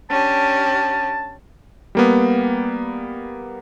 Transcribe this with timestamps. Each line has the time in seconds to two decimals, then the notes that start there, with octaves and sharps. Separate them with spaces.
0.10 C#4 D4 G4 A5
1.95 G3 A#3 B3